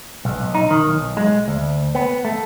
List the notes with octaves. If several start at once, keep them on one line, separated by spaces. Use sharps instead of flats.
B1
B1
D#4
D#3
B1
G#3
D2
B3
A3